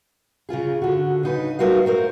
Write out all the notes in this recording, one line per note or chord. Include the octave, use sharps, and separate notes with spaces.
C#3 C#4 F4 G#4
D3 F#4
C#3 D#4 B4
A3 D#4 F#4 A#4 B4 F5
F#4 A#4 C5